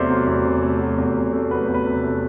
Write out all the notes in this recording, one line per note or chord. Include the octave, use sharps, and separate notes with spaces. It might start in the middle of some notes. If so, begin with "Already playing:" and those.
Already playing: E2 C3 F#3 A3 C5 D5 E5
F#3
E2
C3
A3
F#3
E2
C3
A3
F#3 B4
E2
B4
C3
A3